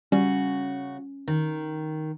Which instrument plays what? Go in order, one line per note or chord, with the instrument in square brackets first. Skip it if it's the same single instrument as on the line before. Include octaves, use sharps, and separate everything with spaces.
[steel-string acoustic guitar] C#3 F#4 [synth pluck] G3 [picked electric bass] C#4
[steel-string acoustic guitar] D#3